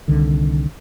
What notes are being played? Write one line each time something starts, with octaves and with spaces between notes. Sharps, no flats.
C2 D3 D#3